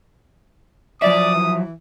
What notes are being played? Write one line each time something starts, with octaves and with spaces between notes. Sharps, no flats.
F3 F#3 D5 E5 D#6
E3